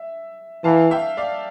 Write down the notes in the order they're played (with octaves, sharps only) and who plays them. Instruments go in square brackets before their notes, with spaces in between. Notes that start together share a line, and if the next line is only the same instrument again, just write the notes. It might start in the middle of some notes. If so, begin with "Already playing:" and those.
Already playing: [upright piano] E5
[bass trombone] E3 [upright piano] F5 A5
[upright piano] E5 G5
D5 F5